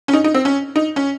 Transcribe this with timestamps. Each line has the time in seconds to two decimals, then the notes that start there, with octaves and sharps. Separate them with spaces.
0.08 C#4
0.13 D#4
0.24 D#4
0.34 C4
0.45 C#4
0.76 D#4
0.96 C#4